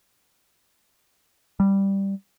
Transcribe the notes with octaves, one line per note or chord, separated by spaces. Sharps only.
G3